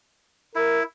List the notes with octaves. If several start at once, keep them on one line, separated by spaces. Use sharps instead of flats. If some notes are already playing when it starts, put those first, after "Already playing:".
E4 A#4